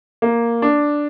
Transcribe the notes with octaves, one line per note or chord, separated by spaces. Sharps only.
A#3
D4